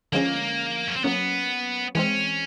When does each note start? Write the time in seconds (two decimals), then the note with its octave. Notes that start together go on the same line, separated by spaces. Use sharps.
0.13 D3 F3 G#3 A#3 C#4
0.88 C#4
0.96 C4
1.04 F#3 A#3 B3 C#4
1.95 E3 G#3 C4 C#4